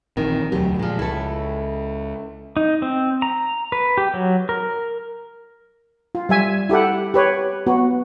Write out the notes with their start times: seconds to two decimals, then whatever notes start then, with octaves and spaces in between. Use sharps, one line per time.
0.17 A#1 D#3 E3 C4
0.52 E1 D2 F#3 G4
0.79 A#2 F3 G#3
0.99 C#2 E4 A4
2.57 D#4
2.82 C4
3.22 A#5
3.72 B4
3.98 G4
4.14 F#3
4.49 A#4
6.15 F4
6.29 G3 E5 G#5
6.69 E4 G4 A4 F#5
7.14 G4 B4 C#5
7.67 B3 F#4